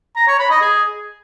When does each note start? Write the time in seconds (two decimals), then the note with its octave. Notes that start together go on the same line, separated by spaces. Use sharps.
0.16 A#5
0.27 C#5
0.39 B5
0.50 D#5
0.61 G#4